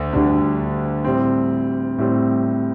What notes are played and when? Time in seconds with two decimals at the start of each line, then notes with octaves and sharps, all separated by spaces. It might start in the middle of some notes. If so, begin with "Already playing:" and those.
Already playing: D2 D3
0.13 D2 D3 G3 D4
1.04 A2 G3 C4
1.98 A2 G3 C4